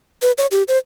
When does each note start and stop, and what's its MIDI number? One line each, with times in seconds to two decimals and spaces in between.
0.22 0.32 71
0.38 0.46 73
0.51 0.63 67
0.68 0.78 72